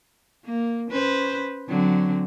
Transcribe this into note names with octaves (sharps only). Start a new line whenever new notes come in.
A#3
C#4 B4 C5
D3 F#3 C4